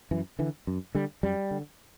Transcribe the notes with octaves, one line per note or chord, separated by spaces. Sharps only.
F#2 E3
D3 E3
F#2
D3 G3
F#2 G3
D3